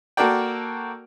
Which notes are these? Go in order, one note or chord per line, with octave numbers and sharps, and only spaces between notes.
A#3 F#4 A4 A#4 D5 G5